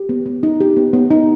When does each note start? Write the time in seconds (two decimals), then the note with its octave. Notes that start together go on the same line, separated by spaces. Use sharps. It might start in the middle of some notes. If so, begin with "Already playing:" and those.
Already playing: G4
0.09 B3
0.26 B3
0.43 D#4
0.60 G4
0.77 B3
0.93 B3
1.11 D#4